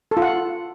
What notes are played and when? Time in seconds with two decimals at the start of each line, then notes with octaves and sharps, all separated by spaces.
0.11 A4
0.17 F4
0.22 F#5